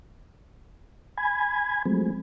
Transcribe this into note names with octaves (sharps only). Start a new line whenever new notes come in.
G#5 B5 G#6
F3 F#3 G#3 A3 C4